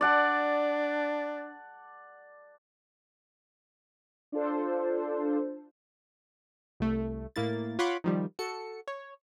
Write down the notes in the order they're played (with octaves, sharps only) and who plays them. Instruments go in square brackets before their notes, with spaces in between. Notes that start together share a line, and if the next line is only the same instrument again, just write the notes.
[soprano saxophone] D4 [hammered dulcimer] D5 F#5 A5
[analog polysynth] D4 F4 A4 C5
[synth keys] C2 A3
A2 A#3 E4 A6
F4 C#5 F#5 B5 C6 D6
D#3 F3 G3
F#4 A4 C#7
C#5